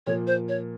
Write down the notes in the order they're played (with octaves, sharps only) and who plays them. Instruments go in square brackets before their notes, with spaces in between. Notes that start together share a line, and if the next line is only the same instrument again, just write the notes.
[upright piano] A#2 F3 A#3 [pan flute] C#5
[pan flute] C5
C#5